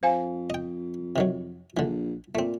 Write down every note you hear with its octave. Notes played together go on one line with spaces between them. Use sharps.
F2 C5 F5 G#5
D#5 G5
C3 D#3 F#3
A#1 D3 E3
A#2 A3 C4